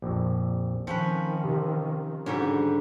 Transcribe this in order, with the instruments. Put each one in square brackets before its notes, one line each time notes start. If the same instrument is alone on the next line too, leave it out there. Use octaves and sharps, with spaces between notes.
[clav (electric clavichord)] A#1 F2
[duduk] D#3 [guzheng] F3 C#4 B4 [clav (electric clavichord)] C4
[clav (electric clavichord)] C3
[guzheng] G#2 D3 G3 [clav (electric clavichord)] C#4 F#4